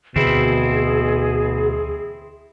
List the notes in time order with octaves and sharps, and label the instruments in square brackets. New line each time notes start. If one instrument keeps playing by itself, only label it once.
[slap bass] D2 D3 E3 [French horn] B2 [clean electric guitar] C4 E4 [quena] G#4